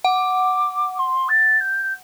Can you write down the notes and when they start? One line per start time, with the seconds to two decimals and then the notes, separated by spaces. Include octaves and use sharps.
0.04 F#5 D6
0.99 C6
1.29 A6
1.60 G6